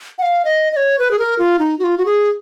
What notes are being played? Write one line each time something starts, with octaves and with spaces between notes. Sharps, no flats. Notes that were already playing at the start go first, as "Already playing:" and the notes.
F#5
F5
D#5
D#5
C#5
B4
G#4
A#4
F4
D#4
F#4
F4
F#4
G#4